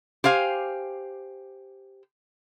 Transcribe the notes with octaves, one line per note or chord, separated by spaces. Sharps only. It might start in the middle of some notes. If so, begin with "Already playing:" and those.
G4 C5 F5 G#5